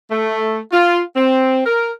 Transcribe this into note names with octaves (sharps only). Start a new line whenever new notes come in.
A3
F4
C4
A#4